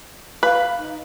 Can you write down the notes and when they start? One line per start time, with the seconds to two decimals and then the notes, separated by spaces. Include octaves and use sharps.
0.43 B4 F5
0.78 D#4